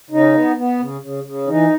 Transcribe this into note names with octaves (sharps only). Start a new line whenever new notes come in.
C#3 D#4
B3
B3
C#3
C#3
C#3
E3 D#4